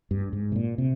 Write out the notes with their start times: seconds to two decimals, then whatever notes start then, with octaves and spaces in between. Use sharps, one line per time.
0.11 G2
0.33 G#2
0.52 C3
0.56 A#2
0.78 C3